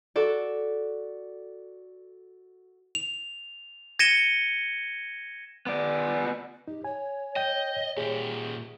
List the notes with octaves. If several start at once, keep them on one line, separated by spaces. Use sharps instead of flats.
F#4 A4 D5
F7
G#6 A#6 C#7 D#7 E7 G7
B3 D5
D#4 G4
C#5 G#5
D#5 G5 G6
A#2 G4 G#4